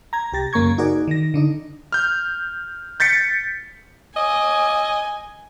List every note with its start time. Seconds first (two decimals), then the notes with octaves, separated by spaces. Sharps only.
0.13 A#5 G#6
0.32 C2 G4 A6 A#6
0.53 F#2 C#3 A#3 A#5 C#6 G#6
0.78 D#4 F#4 G#4 A#4 D5
1.08 D#3 A#6
1.34 D3 D4 D#4
1.92 F6 G6
3.00 G6 A6 B6 C#7
4.16 D#5 G#5